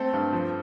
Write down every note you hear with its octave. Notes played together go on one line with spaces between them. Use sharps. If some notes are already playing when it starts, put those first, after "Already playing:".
Already playing: A3 C4 A4
G2
F3